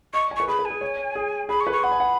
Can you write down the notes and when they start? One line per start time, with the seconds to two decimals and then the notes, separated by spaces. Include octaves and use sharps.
0.13 D#5 C#6
0.31 G#5
0.36 B4 C#6
0.48 G#4 B5
0.59 B4
0.65 G#5
0.70 G#4
0.81 C#5
1.15 G#4
1.49 G#4 B5
1.60 C#6
1.67 B4
1.72 C#6
1.84 F#5 B5
1.92 G#5
2.00 F#5